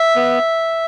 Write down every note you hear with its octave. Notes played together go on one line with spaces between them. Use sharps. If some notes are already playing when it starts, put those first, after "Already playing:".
Already playing: E5
B3